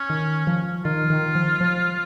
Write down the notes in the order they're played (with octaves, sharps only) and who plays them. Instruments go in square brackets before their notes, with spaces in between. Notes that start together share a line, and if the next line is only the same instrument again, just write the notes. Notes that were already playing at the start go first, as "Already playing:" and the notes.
Already playing: [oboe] C#4
[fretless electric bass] D#3
F3
[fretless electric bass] D#3 [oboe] F4
[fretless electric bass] D#3
F3
F3